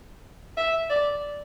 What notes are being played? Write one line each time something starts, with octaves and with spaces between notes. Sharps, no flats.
E5
D5